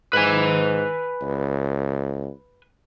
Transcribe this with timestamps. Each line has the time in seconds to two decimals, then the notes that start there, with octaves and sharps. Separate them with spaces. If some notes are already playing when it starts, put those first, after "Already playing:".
0.13 G#2 B4 G#5
1.22 C#2